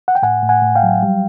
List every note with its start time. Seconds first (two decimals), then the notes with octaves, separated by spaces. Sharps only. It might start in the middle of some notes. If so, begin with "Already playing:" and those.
0.08 F#5
0.15 G5
0.23 A2 F#5 G#5
0.43 A2
0.49 F#5 G#5
0.62 A2
0.75 F5 G5
0.83 F#3
1.03 G3